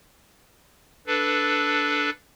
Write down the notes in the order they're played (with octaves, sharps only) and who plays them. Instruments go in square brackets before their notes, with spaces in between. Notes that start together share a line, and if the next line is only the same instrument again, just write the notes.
[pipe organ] D4 A4 B4